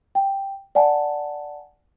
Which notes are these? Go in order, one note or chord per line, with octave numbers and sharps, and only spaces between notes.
G5
D5 F#5 G#5 A5